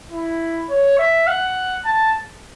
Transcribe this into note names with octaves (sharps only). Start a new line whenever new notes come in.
E4
C#5
E5
F#5
A5